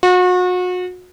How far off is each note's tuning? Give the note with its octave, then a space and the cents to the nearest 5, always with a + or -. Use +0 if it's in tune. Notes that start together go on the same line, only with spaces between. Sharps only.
F#4 -35